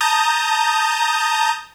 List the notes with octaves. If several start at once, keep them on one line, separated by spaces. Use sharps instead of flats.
A5 A#5 D#6 G6